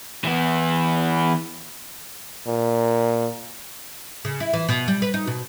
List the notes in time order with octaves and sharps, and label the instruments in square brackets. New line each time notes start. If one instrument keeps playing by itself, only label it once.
[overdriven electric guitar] E3 B3
[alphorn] A#2
[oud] C#3
E4
E3
B2
G3
B4
D#4
B2